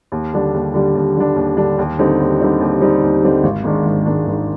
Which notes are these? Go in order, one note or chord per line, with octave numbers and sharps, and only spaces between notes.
D#2
D3 G3 D4
D#2
D3 G3 D4
D#2
D3 G3 D4
D#2
D3 G3 D4
D#2
D3 G3 C4 D#4
D#2
D3 G3 C4 D#4
D#2
D3 G3 C4 D#4
D#2
D3 G3 C4 D#4
G#1
G#2 D#3 G#3 D4
G#1
G#2 D#3 G#3 D4
G#1